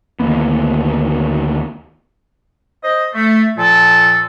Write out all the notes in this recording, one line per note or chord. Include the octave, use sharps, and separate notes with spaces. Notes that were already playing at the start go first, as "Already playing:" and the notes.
D2 D#3 A#3 B3
C5 D#5
A3
A#2 F3 A4